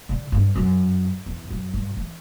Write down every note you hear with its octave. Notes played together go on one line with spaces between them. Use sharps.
D3
G2
F#2
E2
F#2
G2
E3